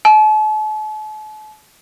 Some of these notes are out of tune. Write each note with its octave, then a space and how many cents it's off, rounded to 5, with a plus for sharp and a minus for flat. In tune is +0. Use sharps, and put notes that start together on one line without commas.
A5 -45